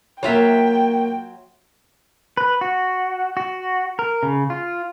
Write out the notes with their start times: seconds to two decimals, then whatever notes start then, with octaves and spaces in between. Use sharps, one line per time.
0.23 F#3 A#3 F4 C#5 E5 G5
2.37 B4
2.61 F#4
3.37 F#4
3.99 A#4
4.23 C#3
4.50 F4